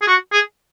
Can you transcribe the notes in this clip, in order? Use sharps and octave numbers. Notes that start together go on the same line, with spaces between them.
G#4
F#4
G#4